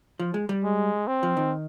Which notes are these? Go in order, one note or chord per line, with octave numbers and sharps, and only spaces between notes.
F3
G#3
G3
G#3
C4
F3
D#3